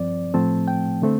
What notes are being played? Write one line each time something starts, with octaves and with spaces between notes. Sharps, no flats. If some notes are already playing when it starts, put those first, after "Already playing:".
Already playing: G2 F3 C4 D5
A2 F3 A3 C4 A5
G5
D3 A3 C4